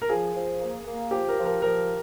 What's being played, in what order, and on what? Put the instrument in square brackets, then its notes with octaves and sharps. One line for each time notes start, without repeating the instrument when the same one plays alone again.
[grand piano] A#4
[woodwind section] F3 [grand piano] G#4
[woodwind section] F3
A#3
A#3
[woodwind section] F3 [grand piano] G4
[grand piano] A#4
[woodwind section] F3
[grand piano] A#4
[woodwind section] F3 [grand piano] A#4